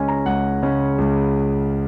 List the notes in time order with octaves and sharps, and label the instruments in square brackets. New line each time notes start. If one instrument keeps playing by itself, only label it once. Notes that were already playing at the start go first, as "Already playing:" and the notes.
Already playing: [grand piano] C#2 C#3 G#3 C#4 G#5
A#5
C#2 F#5
C#3 G#3 C#4
C#2